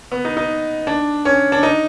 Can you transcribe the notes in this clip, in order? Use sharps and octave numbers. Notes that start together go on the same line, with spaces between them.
B3
D#4
D#4
D4
C#4
D4
D#4